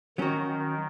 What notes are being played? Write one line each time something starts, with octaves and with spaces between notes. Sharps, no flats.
D#3 F#3 C#4 F#4
D#3